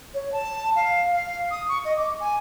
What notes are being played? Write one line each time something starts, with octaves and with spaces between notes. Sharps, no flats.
C#5
A5
F5
F5
D#6
C#6
D#5
D6
G#5